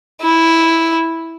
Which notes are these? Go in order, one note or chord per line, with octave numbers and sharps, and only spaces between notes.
E4